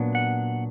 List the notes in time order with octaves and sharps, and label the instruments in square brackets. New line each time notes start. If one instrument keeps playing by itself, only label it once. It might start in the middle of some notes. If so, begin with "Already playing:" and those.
Already playing: [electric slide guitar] A#2 F#3 B3 D4
F#5